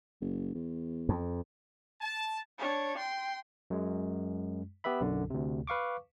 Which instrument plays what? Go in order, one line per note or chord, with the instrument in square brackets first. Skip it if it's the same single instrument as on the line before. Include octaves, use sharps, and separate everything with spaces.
[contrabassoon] F#1
E2
[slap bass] F2
[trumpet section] A5
[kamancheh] D4 C#5
G5 C6
[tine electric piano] F#2 G#3
B3 G4 B4 E5 B5
B1 F#2 D3
D2 C3
B4 F5 C#6 D6